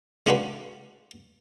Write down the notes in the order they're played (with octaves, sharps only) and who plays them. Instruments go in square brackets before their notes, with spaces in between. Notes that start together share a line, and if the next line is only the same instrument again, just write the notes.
[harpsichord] G#3 C#4 D4 F4 F#4 B4